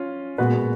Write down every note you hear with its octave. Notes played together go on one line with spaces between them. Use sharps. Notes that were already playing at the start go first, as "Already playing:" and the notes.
Already playing: C#4 F4
A#2 G#3 B3 F#4 B4